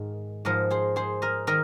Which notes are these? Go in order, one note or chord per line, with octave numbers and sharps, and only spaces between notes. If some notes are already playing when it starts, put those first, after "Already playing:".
Already playing: G#2 D#3 G#4
G#2 F3 A#4 D#5
G#4 C5
G#4 C5
A#4 D#5
D#3 A#4 D#5